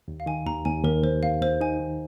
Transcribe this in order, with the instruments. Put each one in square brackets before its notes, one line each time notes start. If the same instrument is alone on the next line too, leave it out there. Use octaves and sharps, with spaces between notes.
[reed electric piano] D#2
[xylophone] F5
[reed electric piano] D#3 [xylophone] G#5
[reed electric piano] D#2 [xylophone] A#5
[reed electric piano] D#2 [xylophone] G#5
[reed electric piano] D#2 [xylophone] A#4
[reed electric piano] D#2 [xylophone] C5
[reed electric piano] D#2 [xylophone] F5
[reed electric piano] D#2 [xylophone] C5
[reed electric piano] D#4 [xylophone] G#5
[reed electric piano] D#3